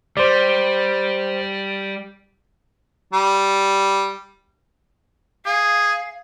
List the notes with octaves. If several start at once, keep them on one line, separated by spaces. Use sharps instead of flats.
G3 C5 D5
G3
G#4 F5